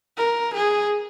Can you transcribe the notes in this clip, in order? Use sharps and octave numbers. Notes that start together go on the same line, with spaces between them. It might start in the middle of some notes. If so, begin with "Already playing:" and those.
A#4
G#4